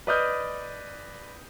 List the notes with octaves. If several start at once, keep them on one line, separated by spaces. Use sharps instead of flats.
B4 D5 D#5 D#6 F6 G6